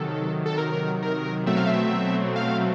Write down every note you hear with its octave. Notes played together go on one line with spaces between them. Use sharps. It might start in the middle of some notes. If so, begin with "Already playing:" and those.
Already playing: C3 D#3 F#3 A4
A4
A#4
A#4
B2 F#3 A3 C4 E5
F5
E5
F5